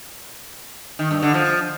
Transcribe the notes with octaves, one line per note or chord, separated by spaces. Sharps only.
D#3
G2
D3
F3